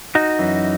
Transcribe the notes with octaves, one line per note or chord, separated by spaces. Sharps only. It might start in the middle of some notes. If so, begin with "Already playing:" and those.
D#4 F#4
F#2 E3